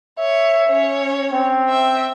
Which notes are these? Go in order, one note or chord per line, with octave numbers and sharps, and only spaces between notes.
C#5 E5
C#4 C#5
C4
E5 G5